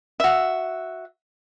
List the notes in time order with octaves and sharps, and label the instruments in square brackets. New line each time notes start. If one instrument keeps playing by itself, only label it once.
[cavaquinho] F#4 E5